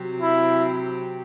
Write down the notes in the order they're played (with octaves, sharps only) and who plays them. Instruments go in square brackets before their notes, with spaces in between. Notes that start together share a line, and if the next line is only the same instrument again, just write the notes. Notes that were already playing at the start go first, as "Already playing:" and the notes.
Already playing: [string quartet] C3 F#3 C4 G4
[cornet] E4